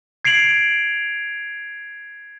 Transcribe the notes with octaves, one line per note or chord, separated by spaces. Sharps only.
G#6 C7 D7 F7 F#7